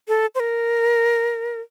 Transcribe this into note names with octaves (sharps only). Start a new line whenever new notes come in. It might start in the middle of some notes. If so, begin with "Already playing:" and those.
A4
C5
A#4